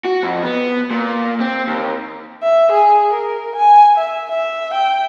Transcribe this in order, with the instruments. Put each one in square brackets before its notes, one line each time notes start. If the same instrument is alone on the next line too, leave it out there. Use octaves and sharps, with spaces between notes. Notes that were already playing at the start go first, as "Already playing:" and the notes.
[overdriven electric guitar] F#4
F2
B3
A#2
C4
D#2
[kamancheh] E5
G#4
A#4
G#5
E5
E5
G5